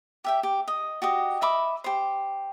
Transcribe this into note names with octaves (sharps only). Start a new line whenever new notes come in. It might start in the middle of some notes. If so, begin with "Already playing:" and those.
G4 E5 G5
G4
D#5
F#4 G4 D#5
D#5 E5 B5 D6
G4 C5